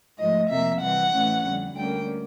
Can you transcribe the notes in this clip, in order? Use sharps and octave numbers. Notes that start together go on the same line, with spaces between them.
G#2 F3 A3 D#5
F2 C3 F3 A#3 E5
C3 E3 G3 C4 F#5
A2 E3 A3 C#4
F2 D3 G3
D2 D3 G3 A#3 C#4 G5